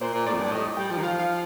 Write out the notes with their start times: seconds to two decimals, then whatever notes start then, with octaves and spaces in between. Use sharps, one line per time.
0.01 A#2 C5
0.13 A#2
0.26 A2 D5
0.34 F2
0.40 G2
0.52 A2 D#5
0.77 G3 G5
0.91 F3
0.98 D#3
1.02 F3 F5
1.19 F5